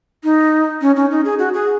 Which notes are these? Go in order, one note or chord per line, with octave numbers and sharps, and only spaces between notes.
D#4
C#4
C#4
D#4
G#4
F#4
G#4